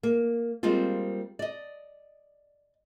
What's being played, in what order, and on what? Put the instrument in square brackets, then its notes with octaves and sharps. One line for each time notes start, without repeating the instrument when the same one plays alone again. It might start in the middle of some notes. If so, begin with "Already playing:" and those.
[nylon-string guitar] A#3
G3 G#3 A#3 C4 F4
D5 D#5